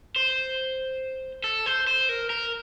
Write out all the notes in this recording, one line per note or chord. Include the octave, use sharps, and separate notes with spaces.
C5
A4
C5
C5
A#4
A#4